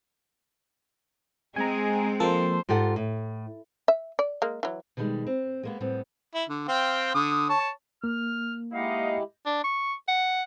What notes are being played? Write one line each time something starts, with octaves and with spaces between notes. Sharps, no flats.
G#3 C4 G#4 G#5 A#5
F3 A#3 A4 C5
G#2 F4 G4 A4 F#5
A2
E5
D5
G#3 A#3
E3 F#3
B2 D3 D#3 G3 G#3
C4
G#3 A#3 B3
A2 G3 B3 C4
E4
D3
C4 F5 G5
D3 D#6
C#5 A5
A#3 F6
G#3 D#4 E4 G4 D#5 F5 F#5
D4
C#6
F#5